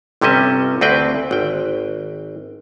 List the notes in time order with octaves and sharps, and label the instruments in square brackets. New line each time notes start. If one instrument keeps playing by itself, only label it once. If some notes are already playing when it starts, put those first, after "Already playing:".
[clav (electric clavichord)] G1 C3 G3 C#4 D#5 E5
D2 C4 B4 G5
G#1 G5